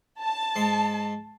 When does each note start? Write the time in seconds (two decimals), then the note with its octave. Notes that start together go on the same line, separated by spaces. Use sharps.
0.21 A5
0.56 G#2 C6